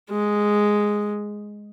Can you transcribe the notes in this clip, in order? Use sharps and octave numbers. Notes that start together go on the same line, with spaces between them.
G#3